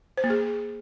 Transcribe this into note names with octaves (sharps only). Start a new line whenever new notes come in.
C5
A#3
G#4